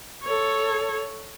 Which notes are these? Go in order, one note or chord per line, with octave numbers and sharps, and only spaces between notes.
A4 C#5